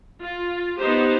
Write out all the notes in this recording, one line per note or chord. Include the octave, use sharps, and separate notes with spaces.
F4
B3 D#4 G4 C5